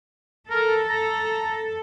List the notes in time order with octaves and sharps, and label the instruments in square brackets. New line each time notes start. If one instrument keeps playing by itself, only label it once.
[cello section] A4 [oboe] A#4
[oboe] A#5